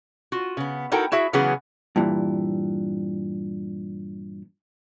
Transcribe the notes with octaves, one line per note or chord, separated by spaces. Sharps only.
F4 F#4
C#3 B3
D#4 E4 F#4 A4 A#4 G5
E4 F#4 G#4 E5
C#3 E3 F#3 B3 G#4
G2 A#2 E3